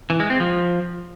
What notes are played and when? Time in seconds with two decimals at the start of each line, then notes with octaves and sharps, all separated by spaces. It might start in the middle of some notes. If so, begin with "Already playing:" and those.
0.10 E3
0.20 G#3
0.30 C4
0.40 F3